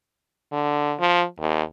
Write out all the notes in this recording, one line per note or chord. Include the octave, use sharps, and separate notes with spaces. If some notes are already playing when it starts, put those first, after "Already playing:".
D3
F3
D#2